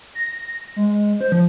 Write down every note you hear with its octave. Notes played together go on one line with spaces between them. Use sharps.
A#6
G#3
C5
F3